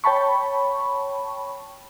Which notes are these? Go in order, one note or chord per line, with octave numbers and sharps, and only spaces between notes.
C#5 G5 A5 B5 C#6